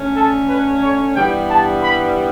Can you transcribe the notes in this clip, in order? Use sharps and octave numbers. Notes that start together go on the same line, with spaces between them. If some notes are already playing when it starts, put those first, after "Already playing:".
Already playing: D3 A3 C#4
A4
B4
C#5
G2 E3 G3 B3 G5
A5
B5